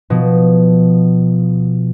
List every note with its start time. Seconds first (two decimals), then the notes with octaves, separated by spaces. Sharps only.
0.10 B2 F3